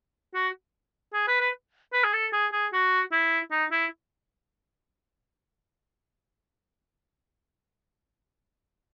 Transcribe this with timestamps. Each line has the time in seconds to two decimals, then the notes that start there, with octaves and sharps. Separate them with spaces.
0.35 F#4
1.14 G#4
1.28 B4
1.41 B4
1.93 B4
2.04 G#4
2.13 A4
2.33 G#4
2.53 G#4
2.73 F#4
3.12 E4
3.51 D#4
3.72 E4